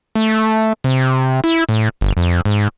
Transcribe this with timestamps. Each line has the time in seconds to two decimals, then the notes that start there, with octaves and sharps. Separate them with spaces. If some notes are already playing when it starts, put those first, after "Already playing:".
0.15 A3
0.84 C3
1.44 E4
1.69 A2
2.01 G1
2.17 F2
2.45 G#2